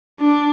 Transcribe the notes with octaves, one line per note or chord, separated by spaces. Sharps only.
D4